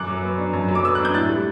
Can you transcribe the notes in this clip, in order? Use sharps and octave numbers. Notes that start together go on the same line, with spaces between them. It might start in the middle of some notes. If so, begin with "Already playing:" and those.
Already playing: F#2 D6 F#6
F#3
B3
D4
F#2
F#3
D6
B3 E6
D4 F#6
G6
A2 F#6 A6
G3